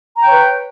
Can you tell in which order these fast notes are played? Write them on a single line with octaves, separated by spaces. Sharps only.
A#5 G5 C#5 B4